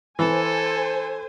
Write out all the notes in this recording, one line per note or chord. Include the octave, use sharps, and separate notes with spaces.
E3 A4 C5 G#5